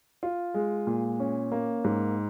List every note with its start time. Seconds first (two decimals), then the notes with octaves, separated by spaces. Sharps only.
0.23 F4
0.54 G#3
0.87 A#2
1.20 C#4
1.52 A#3
1.84 G#2